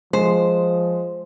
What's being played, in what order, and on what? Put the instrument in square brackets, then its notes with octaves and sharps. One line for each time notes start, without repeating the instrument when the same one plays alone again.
[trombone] F3 [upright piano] G#3 [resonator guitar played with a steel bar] C5